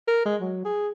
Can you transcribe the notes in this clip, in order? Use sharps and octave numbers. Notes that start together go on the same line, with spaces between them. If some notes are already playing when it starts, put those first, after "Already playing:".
A#4
G#3
F#3
G#4